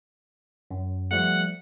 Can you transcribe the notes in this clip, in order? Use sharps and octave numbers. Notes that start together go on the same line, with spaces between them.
F#2
F3 G3 A3 F#5